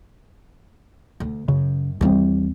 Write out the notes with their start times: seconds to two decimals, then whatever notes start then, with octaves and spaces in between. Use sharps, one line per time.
1.20 D2
1.48 F#2 C#3
2.01 D#2 E3 G3 G#3 C4